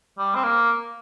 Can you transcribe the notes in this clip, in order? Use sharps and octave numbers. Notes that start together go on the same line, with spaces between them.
G3
C4
A#3